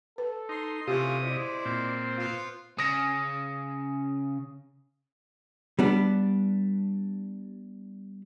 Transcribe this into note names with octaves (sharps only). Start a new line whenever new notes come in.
A4 B4
D#4 C6
C3 E3 A3 C#4 F4 G4 D#6
G#3 E4 C5 D5
A#2 C4
B3 F4
C#3 D#6 A#6
G3 B3 D4